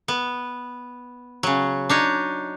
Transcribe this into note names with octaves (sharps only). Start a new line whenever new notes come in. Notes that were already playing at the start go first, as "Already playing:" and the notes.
B3
C#3 F#3
D4 D#4 C#5